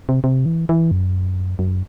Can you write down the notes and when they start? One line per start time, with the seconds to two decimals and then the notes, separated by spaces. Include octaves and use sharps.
0.09 C3
0.24 C3
0.46 E3
0.69 E3
0.91 F#2
1.59 F#2